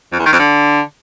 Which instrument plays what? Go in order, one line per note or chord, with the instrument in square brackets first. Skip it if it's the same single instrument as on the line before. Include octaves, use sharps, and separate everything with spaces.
[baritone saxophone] F2
E2
D#3
F2
D3